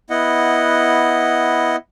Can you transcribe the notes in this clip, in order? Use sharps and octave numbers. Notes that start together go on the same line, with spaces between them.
B3 E4 D#5 F#5